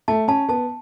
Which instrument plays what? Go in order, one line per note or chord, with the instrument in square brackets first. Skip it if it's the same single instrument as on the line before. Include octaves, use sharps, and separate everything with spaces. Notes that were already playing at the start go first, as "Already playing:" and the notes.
[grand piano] A3 [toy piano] A5
[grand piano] C#4 [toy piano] A5
[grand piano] B3 [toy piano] A5